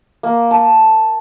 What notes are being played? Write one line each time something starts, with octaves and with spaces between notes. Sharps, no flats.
A#3
A5